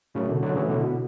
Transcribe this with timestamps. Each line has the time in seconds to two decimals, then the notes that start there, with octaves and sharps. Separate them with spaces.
0.15 F#2 A2 C#3
0.28 B2 D3
0.43 D3 F#3
0.56 A2 C#3 E3
0.69 B2 D3
0.83 B2